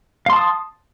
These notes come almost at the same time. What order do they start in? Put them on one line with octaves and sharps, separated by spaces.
F5 C6 A5 D#6